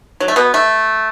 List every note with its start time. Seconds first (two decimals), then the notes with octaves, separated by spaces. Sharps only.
0.20 F#3
0.28 A3
0.36 B2 B3
0.54 A3